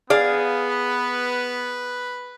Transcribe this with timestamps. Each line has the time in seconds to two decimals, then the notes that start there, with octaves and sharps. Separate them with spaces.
0.10 B3 G#4 D5 F5
0.69 B4